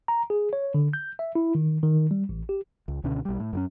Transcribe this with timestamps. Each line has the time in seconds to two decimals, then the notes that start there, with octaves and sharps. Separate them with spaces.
0.08 A#5
0.30 G#4
0.53 C#5
0.74 D3
0.93 G6
1.19 E5
1.35 E4
1.55 D#3
1.83 D#3
2.11 G3
2.29 A1
2.49 G4
2.88 C#2
3.04 C#2 B2 D3 C#4
3.25 B1 G3
3.40 A2
3.53 F#2 F#3 C#4